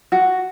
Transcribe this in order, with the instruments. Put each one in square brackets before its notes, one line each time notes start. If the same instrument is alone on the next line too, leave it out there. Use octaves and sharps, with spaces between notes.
[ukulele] F#4